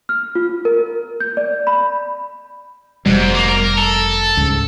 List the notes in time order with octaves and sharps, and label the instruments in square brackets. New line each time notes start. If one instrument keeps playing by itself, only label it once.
[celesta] F6
F4
A#4
G6
D5
B5
[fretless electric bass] F1 B2 G3 [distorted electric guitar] G#2
[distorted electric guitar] A#3
A#4
A4
[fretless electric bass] C#2 G#2